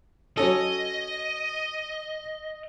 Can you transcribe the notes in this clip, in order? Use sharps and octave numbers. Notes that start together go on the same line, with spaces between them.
F#3 C#4 A4 D#5